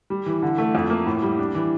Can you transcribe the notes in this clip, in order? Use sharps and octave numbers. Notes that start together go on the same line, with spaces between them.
G3
E3
D3
A3
F2
A#3
A2
G3
D4
E3